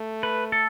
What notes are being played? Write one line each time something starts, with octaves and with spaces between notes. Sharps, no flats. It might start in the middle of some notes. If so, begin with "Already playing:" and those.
Already playing: A3
B4
A4